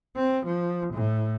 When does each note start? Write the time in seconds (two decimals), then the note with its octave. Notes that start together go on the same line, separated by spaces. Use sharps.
0.16 C4
0.46 F3
0.94 A2